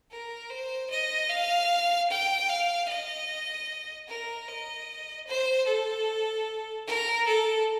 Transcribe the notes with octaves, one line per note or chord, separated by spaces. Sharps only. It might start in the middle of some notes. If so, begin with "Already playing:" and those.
A#4
C5
D#5
F5
G5
F5
D#5
A#4
D#5
C5
A4
A#4
A4